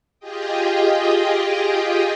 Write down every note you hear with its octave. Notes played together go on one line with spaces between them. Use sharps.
F4 G4 G#4 D#5 G5